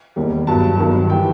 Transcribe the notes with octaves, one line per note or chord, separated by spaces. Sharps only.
E1 D#2 D#3 G3
G1 G2 F#3 A5
G1 G2 D#3 F#3
E3 G3 G5